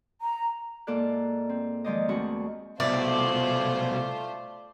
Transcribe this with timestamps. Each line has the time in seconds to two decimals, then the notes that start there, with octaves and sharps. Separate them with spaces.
0.21 A#5
0.87 G#2 A#3 F4 A4 D5 F#6
1.49 C4
1.84 D#3 F3 G#3 C5 D5 D#5
2.09 D#2 G#3 A3 C4 F#4 C#6
2.80 C2 B2 A3 F4 C5 D5 E5 D6